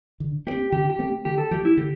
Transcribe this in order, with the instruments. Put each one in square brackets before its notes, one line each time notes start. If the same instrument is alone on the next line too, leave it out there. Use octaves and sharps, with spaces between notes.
[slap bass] D3
[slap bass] A3 C4 [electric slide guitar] G4
[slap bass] D3 [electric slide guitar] G4
[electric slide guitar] G4
[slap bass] A3 C4
[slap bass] D3 [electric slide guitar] G4
[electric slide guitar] A4
[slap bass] F3 A3 [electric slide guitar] G4
[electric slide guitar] E4
[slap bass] D3 [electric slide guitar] G4